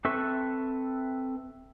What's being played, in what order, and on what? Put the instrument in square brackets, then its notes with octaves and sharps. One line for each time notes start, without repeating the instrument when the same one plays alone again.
[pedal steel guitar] C4 A4 B4 E5 C#6